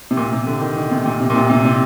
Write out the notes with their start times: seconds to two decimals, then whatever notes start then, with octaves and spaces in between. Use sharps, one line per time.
0.11 C3
0.17 A#2
0.32 C3
0.47 D3
0.61 D#3
0.77 D#3
0.91 C3
1.06 A#2
1.21 C3
1.30 A#2
1.36 C3
1.50 C3
1.65 C3